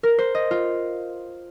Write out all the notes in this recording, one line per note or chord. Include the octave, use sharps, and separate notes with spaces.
A#4
C5
D#5
F4